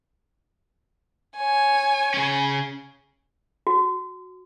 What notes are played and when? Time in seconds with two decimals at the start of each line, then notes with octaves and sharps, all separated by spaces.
1.37 C#5 G#5
2.14 C#3 C#4
3.67 F#4